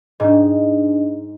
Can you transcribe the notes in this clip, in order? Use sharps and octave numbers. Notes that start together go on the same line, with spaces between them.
G#2 D4 D#5